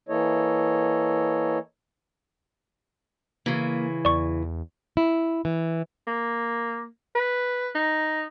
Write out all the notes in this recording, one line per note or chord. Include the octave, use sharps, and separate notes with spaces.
E3 A#3 E4 A4 C#5 D#5
C#3 E3 A#3
E2 D5 C#6
E4
E3
A#3
B4
D#4